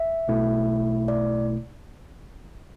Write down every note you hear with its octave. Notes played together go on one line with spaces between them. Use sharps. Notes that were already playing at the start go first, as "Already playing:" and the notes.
Already playing: E5
B1 B2 A3 E4
D5